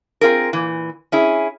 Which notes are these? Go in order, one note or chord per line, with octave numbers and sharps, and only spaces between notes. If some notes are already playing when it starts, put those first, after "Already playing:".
C4 F4 G#4 A#4
A#2 E3
C#4 E4 G#4